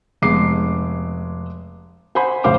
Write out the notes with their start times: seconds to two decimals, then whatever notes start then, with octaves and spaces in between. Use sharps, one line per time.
0.22 F1 G#3 B3 D6 C7
2.15 C5 F#5 G#5 B5
2.44 F1 A2 C#3 C5 F5 D6